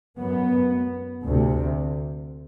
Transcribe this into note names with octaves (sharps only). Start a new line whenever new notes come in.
F#2 B3
D2 C3